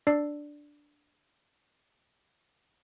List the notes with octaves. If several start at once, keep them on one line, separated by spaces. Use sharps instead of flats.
D4 D5 E6 C7